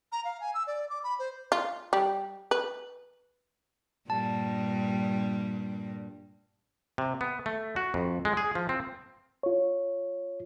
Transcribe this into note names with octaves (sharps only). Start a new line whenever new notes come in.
A#5
F5
G#5
E6
D5
D6
B5
C5
F4
G3
B4
G2 A#2 G3 A5
C3
B3
A3
F#4
F2
G#3
G#4
F3
C4
F4 C#5